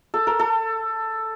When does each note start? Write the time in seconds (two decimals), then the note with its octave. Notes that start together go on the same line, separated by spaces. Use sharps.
0.14 A4
0.27 A#4
0.39 A4